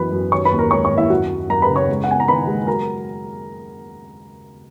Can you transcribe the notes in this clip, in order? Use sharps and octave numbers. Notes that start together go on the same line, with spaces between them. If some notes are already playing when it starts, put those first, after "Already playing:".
Already playing: F#2 E3 B3 B4 B5
F#2
D#3 C#5 C#6
B4 B5
D#2
A#4 A#5
G#3 C#5 C#6
C#5 C#6
D#2
E4 E5
F#2 F#4 F#5
F#3
F#2 A#4 A#5
B4 B5
C#3
C#5 C#6
G#3
F#5
B3 G#5
A#5
D#3 B4 B5
G#3
F#3 A#4 A#5